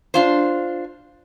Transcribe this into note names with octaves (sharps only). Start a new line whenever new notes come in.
D4 F4 C5